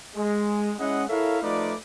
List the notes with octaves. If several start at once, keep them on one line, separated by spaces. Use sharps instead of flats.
G#3
G#3 C#4 E4 G#4 D#5 F#5
E4 A4 A#4 C#5 E5 F5
F3 A3 D#4 F4 B4 D5